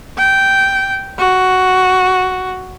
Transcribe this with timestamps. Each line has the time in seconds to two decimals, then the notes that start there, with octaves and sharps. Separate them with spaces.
0.17 G5
1.18 F#4